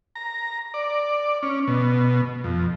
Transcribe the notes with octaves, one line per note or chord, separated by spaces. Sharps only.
A#5
D5
C#4
B2
F2